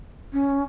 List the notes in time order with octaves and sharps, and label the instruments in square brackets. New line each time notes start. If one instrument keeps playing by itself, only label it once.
[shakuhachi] C#4